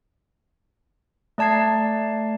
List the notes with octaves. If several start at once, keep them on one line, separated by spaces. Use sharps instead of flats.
A3 D5 A5 G#6 C7